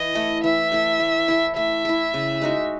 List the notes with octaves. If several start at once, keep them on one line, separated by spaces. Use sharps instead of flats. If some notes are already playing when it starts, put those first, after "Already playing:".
Already playing: E3 D#5
A3 E4 A4
E3 E5
A3 E4 A4
A3
E4 A4
A3 E5
E4 A4
C#3
G#3 D#4 F#4